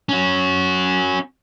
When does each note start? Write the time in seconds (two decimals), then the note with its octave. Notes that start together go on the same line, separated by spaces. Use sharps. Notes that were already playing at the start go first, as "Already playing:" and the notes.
0.09 C#4 F#4